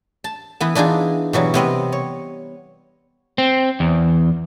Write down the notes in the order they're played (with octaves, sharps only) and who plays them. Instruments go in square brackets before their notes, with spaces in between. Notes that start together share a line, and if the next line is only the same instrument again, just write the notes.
[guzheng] A5
E3 B3
E3 D4 D#4 F4 G#4
B2 E3 F#3 G3
C3 B3 C4 D#5
C#5
[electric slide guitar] C4
E2